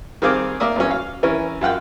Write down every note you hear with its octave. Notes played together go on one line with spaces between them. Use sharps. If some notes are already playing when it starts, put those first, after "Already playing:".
D#3 G3 C4 G#4 F5 D6
A#3 A#4 D5 E5 D#6
E2 F#3 C#4
F5
E3 C#4 A#4
F#2 F4 F#5 G5